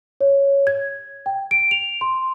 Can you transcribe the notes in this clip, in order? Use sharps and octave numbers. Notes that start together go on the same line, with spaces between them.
C#5
G#6
G5
D7
F7
C6